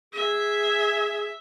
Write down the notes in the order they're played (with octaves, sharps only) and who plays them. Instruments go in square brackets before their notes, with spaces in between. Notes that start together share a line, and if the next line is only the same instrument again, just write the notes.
[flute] G#4 [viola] E5